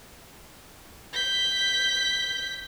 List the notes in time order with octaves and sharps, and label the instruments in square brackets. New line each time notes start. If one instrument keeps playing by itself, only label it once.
[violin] G6 B6